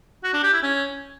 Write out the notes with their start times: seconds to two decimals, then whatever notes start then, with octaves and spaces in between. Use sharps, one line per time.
0.24 F#4
0.33 D4
0.43 G4
0.53 E4
0.63 C#4